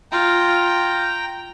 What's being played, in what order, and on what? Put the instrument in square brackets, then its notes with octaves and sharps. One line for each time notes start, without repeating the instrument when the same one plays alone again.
[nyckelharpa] F4 [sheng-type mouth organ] G5 A#5